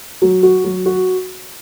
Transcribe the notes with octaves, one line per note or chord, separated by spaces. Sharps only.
F#3
F#4
F#3
F#4